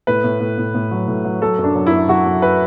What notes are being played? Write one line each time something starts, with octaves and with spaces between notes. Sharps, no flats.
A2 B4
A2
A2
A2
A2
F#3
A2
F#3
F#3 A4
F#2
D4
F#3
E4
F#2
F#3 F#4
F#3
B4